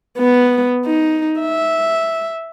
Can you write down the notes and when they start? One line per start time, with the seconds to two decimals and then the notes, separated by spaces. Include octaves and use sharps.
0.18 B3
0.86 D#4
1.40 E5